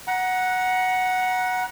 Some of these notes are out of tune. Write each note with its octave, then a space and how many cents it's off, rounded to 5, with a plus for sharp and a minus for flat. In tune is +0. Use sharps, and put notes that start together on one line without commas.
F#5 +0 A#5 +30